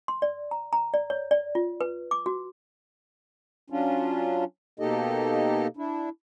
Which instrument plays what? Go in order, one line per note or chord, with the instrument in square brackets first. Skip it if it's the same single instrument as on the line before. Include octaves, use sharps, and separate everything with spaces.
[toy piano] C6
D5
A#5
A#5
D5
C#5
D5
F4
B4
D6
F#4
[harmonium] F#3 C#4 D4 F4
B2 A#3 D#4 G4 A4 D#5
D4 E4